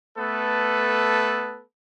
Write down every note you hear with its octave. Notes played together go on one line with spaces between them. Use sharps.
A3 B3 A4 B4